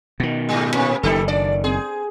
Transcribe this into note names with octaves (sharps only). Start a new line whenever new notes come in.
B2 D#3
G#2 G3
A2 C3 C#4 B4
F#1 D#3 D#4 G4 A4
D4 D5
C4 G#4